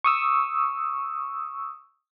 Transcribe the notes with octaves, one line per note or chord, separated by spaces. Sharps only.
C#6 D#6 E6